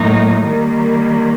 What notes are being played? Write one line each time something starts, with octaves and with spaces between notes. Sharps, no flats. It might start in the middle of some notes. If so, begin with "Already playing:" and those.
Already playing: A2 F#3 A#3 D#4
D#3 G3 A#3